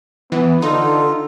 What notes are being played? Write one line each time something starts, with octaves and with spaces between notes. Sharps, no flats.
E3 B3
D3 D#4 F4 A4